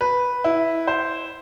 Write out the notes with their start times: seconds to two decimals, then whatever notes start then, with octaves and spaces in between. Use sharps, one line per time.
0.01 B4
0.44 E4
0.87 C5